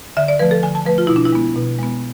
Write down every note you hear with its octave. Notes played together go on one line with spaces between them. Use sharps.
D3 E5
D5
F3 A3 B4
A4
D3 G#5
A5
F3 A3 B4
F4
B2 E4
D4
E4
G#3 B3
B2
G#3 B3